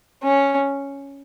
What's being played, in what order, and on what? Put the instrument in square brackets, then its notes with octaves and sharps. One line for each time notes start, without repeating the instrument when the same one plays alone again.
[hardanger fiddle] C#4